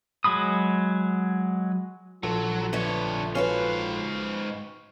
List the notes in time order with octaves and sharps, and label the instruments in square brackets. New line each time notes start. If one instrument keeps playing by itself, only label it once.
[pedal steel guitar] F#3 G#3 B5 D#6
[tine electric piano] A#1 A4 [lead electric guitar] F#3 [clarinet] F4
[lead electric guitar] D3 C#5 [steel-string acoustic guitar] A3 B3
[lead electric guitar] G#2 F5 [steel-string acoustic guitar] C#4 F#4 B4